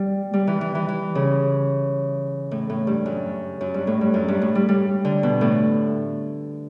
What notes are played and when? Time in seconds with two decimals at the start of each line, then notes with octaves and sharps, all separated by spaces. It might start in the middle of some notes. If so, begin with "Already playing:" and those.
Already playing: G3
0.34 G3
0.47 E3
0.61 E3
0.75 E3
0.89 E3
1.15 C#3
2.51 A2
2.70 A2
2.87 G2
3.06 F#2
3.61 F#2
3.74 G2
3.87 A2
4.01 G2
4.14 F#2
4.28 G2
4.41 A2
4.55 G3
4.69 G3
5.05 D3
5.23 B2
5.41 A2